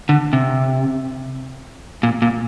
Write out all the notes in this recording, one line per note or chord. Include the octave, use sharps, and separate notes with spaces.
D3
C3
A#2
A#2